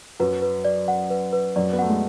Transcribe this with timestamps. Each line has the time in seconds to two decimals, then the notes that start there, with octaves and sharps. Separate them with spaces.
0.20 F#2 F#3 B4
0.42 B4
0.65 D5
0.88 F#5
1.10 B4
1.33 B4
1.56 F#2 F#3 D5
1.73 B3
1.79 A3 F#5
1.90 G#3